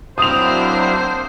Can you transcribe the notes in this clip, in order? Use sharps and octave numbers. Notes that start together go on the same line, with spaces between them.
F#3 A#3 C4 D4 E4 C5 D#6 F7